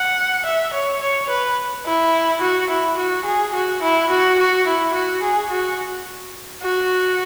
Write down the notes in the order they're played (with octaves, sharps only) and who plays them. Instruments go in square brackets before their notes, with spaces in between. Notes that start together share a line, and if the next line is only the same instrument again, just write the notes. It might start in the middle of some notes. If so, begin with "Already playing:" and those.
Already playing: [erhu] F#5
E5
C#5
C#5
B4
E4
F#4
E4
F#4
G#4
F#4
E4
F#4
F#4
E4
F#4
G#4
F#4
F#4